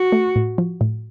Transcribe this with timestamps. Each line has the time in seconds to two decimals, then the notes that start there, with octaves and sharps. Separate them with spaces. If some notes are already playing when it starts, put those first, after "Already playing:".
Already playing: F#4
0.12 A3
0.36 A2
0.58 F3
0.81 A2